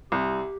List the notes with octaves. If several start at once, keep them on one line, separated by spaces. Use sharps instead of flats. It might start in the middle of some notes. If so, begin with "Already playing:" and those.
C2 G4